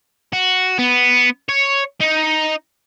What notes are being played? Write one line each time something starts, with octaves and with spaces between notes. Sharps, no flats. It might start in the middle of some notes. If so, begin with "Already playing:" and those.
F#4
B3
C#5
D#4